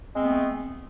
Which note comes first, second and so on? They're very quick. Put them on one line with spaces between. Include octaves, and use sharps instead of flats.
G#3 C4 B3 A3